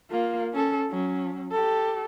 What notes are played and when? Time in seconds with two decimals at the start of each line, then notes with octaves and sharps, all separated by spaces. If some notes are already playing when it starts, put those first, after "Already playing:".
0.11 A#3 F4
0.54 C#4 A4
0.91 F#3 C#4
1.52 G4 A4